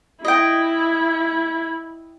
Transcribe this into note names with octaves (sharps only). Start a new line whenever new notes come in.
E4 D#5 G5